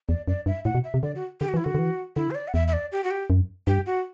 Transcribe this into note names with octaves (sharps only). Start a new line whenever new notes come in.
E2 D5
F#2 D5
G2 E5
A2 F#5
B2
E5
C3
D3 D5
F#4
D3 G4
F#4
E3
E4
D3 F#4
D3
E3
D3 E4
C5
D5
F#5
E2 E5
E5
D5
G4
F#4
G4
F#2
G2 G4
F#4